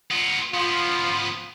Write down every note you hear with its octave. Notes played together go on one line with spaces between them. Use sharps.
B3 F4
F3 B3 F4